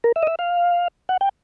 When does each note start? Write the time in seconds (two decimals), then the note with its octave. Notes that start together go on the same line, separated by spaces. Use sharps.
0.04 A#4
0.16 E5
0.23 D#5
0.27 E5
0.39 F5
1.09 F#5
1.21 G5